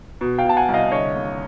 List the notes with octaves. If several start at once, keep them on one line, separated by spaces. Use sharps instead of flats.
B2
F5 G5
B2 A5
F#5 G#5
C2
D#5 F5
D3 C#5 D#5
D#2